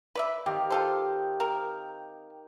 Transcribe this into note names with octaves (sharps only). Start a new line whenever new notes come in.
B4 D5 E5
D#3 C4 G4 F5
F4 A4 C5
C4 A#4